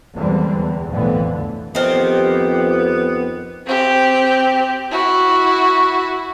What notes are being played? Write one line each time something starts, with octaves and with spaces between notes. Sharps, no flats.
E2 D3 E3 G3 G#3 C4
E2
B1 F2 A2 D3 E3 B3
F2 D#3 B3 C4 G4
C4 G4
E4 F#4